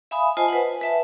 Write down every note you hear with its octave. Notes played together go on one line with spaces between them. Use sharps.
E5 F5 G#5 B5 D#6
F4 C5 D#5 G#5 A5
B4 C5 F#5
B4 E5 A5